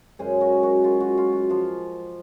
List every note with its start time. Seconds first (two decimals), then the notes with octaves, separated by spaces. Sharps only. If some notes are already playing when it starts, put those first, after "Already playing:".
0.19 F#2 C#3 G#3 C#4 G#4 C5
0.41 F#4 A#4
0.63 F#4
0.84 F4
1.00 F#4
1.18 F4
1.33 F#4
1.49 F3 F4